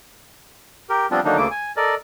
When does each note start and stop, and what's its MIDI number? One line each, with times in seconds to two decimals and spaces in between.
0.90 1.07 67
0.90 1.07 70
1.11 1.20 53
1.11 1.20 55
1.11 1.20 59
1.11 1.20 60
1.11 1.20 62
1.11 1.20 65
1.25 1.37 50
1.25 1.37 51
1.25 1.37 54
1.25 1.37 58
1.25 1.37 62
1.25 1.37 63
1.37 1.48 38
1.37 1.48 49
1.37 1.48 57
1.37 1.48 58
1.37 1.48 86
1.51 1.72 80
1.77 1.95 69
1.77 1.95 70
1.77 1.95 74
1.77 1.95 75